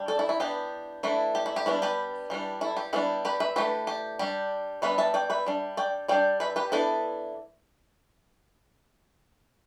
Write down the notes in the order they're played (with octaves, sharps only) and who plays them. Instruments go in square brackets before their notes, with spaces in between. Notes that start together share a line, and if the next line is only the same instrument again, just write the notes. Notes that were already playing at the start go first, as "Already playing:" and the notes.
Already playing: [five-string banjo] G3 D4
A4 D5
E4 A4
E4
E3 B3 D4 G4
E3 A3 D4 E4
G4
E4
G4
G3 B3 D4 E4 A4
G4 B4
E3 G3 D4
E4 A4
G4
G3 B3 D4 E4 A4
G4 B4
B4 E5
E3 A3 D4 G4 B4
G4
G3 D4 G4
G3 B3 D4 B4 E5
E5 A5
D5 G5
B4 E5
G3 D4
D5 G5
G3 D4 D5 G5
B4 E5
G4 B4
E3 B3 D4 E4 A4